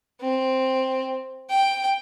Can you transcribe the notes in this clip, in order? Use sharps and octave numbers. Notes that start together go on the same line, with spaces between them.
C4
G5